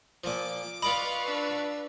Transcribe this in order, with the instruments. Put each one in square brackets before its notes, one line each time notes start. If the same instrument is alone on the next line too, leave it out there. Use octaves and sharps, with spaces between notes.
[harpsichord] A#2 F3 [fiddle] D6
[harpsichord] F4 D5 D#5 [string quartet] B4 F5 C#6 [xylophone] B5
[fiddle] D4 E6